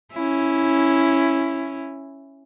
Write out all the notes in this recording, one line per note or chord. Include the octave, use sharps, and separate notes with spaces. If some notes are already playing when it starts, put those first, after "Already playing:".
C#4 E4